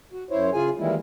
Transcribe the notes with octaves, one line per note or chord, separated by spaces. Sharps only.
F#4
F#2 E4 C5 C#5
C#3 F4 G#4 G#5
D#3 E3 G3 G#3 A#3 E4